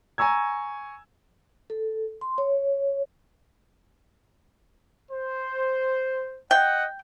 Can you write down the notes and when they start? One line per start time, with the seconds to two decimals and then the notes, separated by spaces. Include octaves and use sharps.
0.18 G#5 A#5 C#6 E6 G#6
1.70 A4
2.21 C6
2.38 C#5
5.10 C5
6.51 D#5 F#5 G5